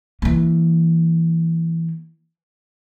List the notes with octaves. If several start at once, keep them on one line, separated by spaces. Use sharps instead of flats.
E3 A#3